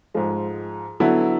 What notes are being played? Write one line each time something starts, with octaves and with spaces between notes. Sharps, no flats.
G#2 F3 G#3
D3 F#3 B3 E4 A4